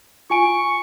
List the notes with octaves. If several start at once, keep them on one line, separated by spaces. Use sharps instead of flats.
F4 G#5 C#6 D7